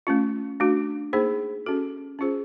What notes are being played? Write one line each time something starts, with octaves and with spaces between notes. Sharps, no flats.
A3 C#4 F4
A3 D4 F#4
A#3 D#4 G#4 C5
C#4 F#4 A4
C#4 F4 G#4 C5